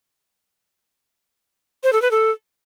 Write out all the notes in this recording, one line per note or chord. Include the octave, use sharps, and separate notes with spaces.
C5
A4
B4
A4